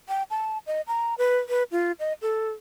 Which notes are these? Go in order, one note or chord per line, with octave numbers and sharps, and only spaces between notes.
G5
A5
D#5
A#5
B4
B4
F4
D#5
A4